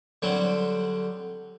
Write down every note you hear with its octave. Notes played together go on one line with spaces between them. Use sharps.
D3 F#3 G3 C4